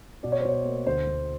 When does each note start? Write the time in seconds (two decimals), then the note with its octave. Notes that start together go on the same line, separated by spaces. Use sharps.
0.23 B2 D5
0.32 C#5
0.40 C5
0.45 B2 C#5
0.65 A#3
0.86 D2 C5
1.06 D2